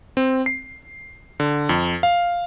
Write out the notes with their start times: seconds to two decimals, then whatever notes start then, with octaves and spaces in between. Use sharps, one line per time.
0.17 C4
0.46 C7
1.40 D3
1.69 F2
2.03 F5